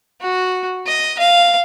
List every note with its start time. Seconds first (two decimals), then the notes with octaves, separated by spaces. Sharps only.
0.22 F#4
0.87 D#5
1.19 F5